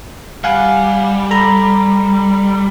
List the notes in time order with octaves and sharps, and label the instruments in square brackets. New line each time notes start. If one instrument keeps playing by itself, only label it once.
[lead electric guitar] G3 [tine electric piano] F5 F#5 G#5
[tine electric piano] A4 A#5 B5